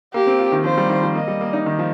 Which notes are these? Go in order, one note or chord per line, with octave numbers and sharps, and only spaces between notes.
A#3 G4
C4
F4
D#3
F3 C5
G3
D#3
F3
A#3 D#5
G3
A#3
D#4
D#3
F3